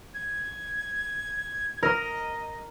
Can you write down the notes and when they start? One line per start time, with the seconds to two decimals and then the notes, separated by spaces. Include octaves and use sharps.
0.14 G#6
1.83 A#4 D#5